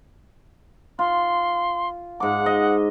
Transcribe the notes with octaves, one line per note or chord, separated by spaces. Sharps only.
F4 C6
G#2 F#5 D6
D#5